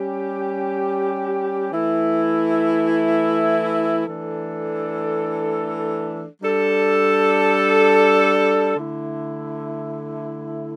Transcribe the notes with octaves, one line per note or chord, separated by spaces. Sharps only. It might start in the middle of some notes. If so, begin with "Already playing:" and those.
Already playing: G3 C#4 G4
E3 A3 E4
E3 A3 D4 A4
G3 D4 A4
D3 A3 E4